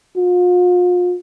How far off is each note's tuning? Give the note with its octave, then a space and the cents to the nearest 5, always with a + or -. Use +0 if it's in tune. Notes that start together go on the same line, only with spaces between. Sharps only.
F4 +40